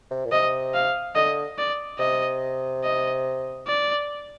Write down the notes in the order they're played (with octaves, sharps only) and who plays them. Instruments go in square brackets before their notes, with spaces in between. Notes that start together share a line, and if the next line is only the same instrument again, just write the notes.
[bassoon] C3
A#2
[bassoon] C3 [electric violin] D#5
[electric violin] F5
[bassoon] D3 [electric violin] D#5
[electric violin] D5
[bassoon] C3 [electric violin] D#5
[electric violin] D#5
D5